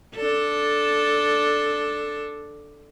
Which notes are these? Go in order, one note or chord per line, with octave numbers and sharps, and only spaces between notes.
D4 A4